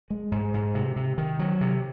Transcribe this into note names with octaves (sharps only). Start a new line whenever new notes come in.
G#3
G#2
G#2
C3
C3
D#3
F#3
C3